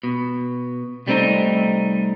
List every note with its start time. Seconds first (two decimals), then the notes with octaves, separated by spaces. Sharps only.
0.03 B2
1.07 C2 G3 A3 C4 D#4